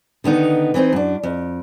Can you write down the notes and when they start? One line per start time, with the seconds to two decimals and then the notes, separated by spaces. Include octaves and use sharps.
0.24 D3 D#3 B3 D#4
0.74 E3 B3 C4 D#4
0.93 F#2 D4
1.23 F2